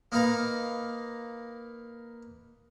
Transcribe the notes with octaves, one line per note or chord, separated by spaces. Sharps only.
A#3 D#4 B4 F5 A#5